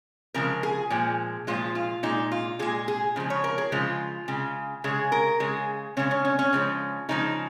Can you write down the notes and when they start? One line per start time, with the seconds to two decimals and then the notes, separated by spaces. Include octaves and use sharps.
0.34 C#3 F3 G#3 A#4
0.63 G#4
0.90 A#2 F3 G#3
1.47 A#2 F3 G#3 F4
1.75 F4
2.03 A#2 G#3 D#4
2.32 F4
2.59 A#2 G#3 G#4
2.88 G#4
3.16 C#3 F3 G#3
3.30 C#5
3.44 A#4
3.58 G#4
3.72 C#3 F3 G#3 F4
4.28 C#3 G#3
4.84 C#3 G#3 G#4
5.12 A#4
5.40 C#3 G#3 G#4
5.97 C#3 G#3 C#4
6.11 C#4
6.25 C#4
6.39 C#4
6.53 C#3 F3 G#3
7.09 C#3 F3 G#3 D#4